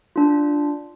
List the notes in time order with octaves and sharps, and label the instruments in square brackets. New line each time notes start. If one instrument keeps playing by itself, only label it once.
[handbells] D4 F4